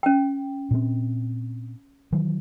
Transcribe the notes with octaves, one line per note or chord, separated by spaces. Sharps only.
C#4 G5
A#2 C4
D#3 E3 F#3